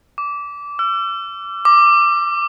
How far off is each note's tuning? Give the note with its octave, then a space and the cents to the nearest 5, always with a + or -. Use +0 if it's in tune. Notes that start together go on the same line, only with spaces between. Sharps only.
D6 -20
E6 +45
D6 +10